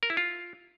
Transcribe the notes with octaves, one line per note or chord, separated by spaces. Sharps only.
A#4
E4
F4